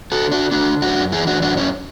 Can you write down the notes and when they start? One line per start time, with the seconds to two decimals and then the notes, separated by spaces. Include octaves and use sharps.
0.12 F#4 A4
0.22 D3
0.32 D4 F#4
0.51 D3 D4 F#4
0.82 F#2 D4 F#4
1.12 E3 E4 G#4
1.27 D4 F#4
1.42 F#2 D4 F#4
1.57 C#4 E4